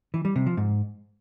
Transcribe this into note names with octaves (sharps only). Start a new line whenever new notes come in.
E3
G3
C3
F3
G#2